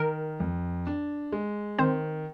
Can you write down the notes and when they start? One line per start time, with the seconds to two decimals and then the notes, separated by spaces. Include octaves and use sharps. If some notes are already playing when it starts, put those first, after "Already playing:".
Already playing: D#3 A#4
0.40 F2
0.87 D4
1.32 G#3
1.79 D#3 C4 C5